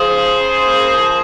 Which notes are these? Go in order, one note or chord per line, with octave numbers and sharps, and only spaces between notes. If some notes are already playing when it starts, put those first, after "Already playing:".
Already playing: F3 G#4 C5
C#3
C#3
A#3
F3